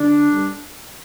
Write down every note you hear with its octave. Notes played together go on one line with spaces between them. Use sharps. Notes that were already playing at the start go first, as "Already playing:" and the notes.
Already playing: D3 D4
G2 D3